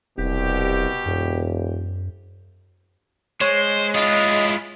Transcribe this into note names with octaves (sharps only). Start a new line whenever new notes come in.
E1 C2 B2 G4
E1 F#2
G#3 C5 C#5
E4 F4 D#5